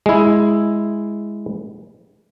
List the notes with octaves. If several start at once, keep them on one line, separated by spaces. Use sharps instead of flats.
G#3 E4